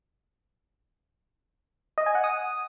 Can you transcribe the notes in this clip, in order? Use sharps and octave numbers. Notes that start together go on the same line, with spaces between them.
D#5
G#5
F#5
D#6